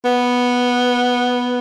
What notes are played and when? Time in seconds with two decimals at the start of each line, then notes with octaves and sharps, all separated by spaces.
0.05 B3